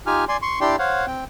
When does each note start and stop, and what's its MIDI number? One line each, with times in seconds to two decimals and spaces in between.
0.06 0.25 63
0.06 0.25 65
0.06 0.25 67
0.06 0.25 80
0.06 0.25 89
0.28 0.37 74
0.28 0.37 80
0.28 0.37 84
0.42 0.60 84
0.42 0.60 85
0.61 0.76 62
0.61 0.76 64
0.61 0.76 67
0.61 0.76 74
0.61 0.76 79
0.61 0.76 84
0.79 1.06 72
0.79 1.06 73
0.79 1.06 77
0.79 1.06 78
1.07 1.25 60
1.07 1.25 79